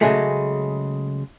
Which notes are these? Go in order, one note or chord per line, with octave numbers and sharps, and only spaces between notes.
C#3 F#3 G#3 A3